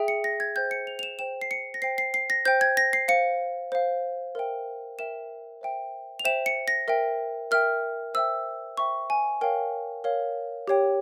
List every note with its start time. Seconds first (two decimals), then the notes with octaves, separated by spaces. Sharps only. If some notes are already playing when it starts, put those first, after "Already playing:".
Already playing: G#4 E5 G5
0.08 C#7
0.24 A#6
0.40 G#6
0.56 C5 G5 G6
0.71 C#7
0.87 F7
0.99 F7
1.03 E7
1.19 C5 G5 E7
1.41 C7
1.51 C#7
1.74 A#6
1.82 C5 G5 C7
1.98 C7
2.14 C7
2.30 A#6
2.45 C5 G5 G6
2.61 G#6
2.77 A#6
2.93 C7
3.08 C5 F5 C#7
3.72 C5 F5
4.35 A#4 E5 G5
4.99 A#4 E5 G5 E7
5.61 C5 E5 G5
6.19 F7
6.25 C5 E5 G5 E7
6.46 C#7
6.68 A#6
6.88 A#4 E5 G5
7.51 A#4 E5 G5 F6
8.14 C5 E5 G5 E6
8.77 C5 E5 G5 C#6
9.10 G#5
9.41 A#4 C#5 F5 G5
10.04 A#4 C#5 F5
10.68 G4 C#5 G5